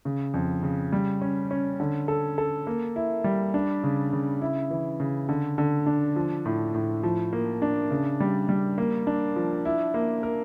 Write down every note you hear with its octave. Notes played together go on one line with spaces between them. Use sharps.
C#3
F2
C#3
G3
C#4
C#4
D3
A4
A4
A#3
E4
G3
D4
C#3
C#3
E4
E3
C#3
D3
D3
D4
F3
A2
A2
F3
A#3
D4
C#3
G3
G3
A#3
D4
F3
E4
A#3
A#4